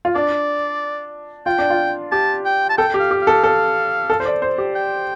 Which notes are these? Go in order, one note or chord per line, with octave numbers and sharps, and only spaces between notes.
F4
D4 D5
F4 G5
D4
F4
G4 A5
G5
A5
A4 G5
G4
F5
G4
A4 F5
A4
A4
C5
D5
C5
G4
G5